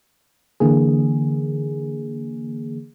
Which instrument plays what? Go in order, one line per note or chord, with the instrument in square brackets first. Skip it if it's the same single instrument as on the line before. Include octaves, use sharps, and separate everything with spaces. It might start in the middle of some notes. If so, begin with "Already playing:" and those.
[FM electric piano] D3 E3 A#3 G#4